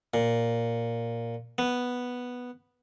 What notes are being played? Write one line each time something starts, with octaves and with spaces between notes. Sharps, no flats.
A#2
B3